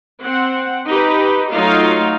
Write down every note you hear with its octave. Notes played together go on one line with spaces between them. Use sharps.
C4 F#5
D#4 G4 B4
F#3 A3 D#4 F4 F5